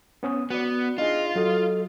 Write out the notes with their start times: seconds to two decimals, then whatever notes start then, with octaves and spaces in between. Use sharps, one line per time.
0.23 B3 C#4 D#6
0.50 B3 F#4 D5
0.98 D4 D#4 F4 G#4 D#5
1.36 F#3 A4 D#5